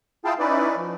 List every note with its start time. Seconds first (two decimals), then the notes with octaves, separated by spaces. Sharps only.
0.25 E4 F4 G#4 F5 G5 A5
0.39 C#4 D#4 E4 B4 D5
0.77 F3